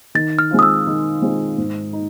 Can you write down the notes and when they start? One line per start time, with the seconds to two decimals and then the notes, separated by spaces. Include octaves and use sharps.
0.15 D#3 A6
0.39 F6
0.51 G#3 C4 F4
0.59 D#6
0.63 E6
0.87 D#3
1.22 G#3 C4 F4
1.58 G#2
1.93 D#4